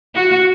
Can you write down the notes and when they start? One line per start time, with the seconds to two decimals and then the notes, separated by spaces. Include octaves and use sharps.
0.15 F#4